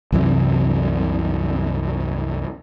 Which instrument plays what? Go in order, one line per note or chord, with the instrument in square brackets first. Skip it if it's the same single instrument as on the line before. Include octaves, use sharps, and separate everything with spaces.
[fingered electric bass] C2 F#2 C3 E3